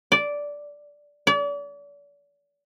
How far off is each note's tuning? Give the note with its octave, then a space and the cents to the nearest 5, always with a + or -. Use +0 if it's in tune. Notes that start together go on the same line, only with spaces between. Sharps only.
D5 -10
D5 -40